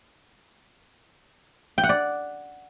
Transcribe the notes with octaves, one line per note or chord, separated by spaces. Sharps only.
G5
F#5
D5